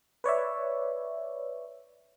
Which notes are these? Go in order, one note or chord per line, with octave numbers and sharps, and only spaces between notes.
B4 C#5 D5 E5